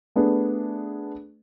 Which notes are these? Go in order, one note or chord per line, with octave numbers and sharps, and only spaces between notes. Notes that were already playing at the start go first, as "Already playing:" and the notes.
A3 B3 D4 G#4